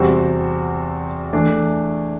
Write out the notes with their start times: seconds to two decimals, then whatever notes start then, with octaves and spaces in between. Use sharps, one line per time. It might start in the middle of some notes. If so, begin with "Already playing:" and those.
Already playing: E2 C3 G3 C4 F#4
1.33 E3 A3 D4